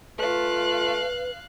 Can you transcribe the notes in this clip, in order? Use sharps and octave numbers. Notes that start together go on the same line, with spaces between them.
A3 F4 B4 F5 F#6